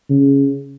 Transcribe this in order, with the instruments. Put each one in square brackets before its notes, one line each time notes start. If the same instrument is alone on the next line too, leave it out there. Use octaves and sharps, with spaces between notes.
[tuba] C#3